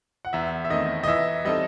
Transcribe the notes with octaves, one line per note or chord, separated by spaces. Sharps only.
F#5
E2 E5
E5
D#3 A3 C4 D#5
D#5
E3 E5
G3 C4 D#4 A4 D#5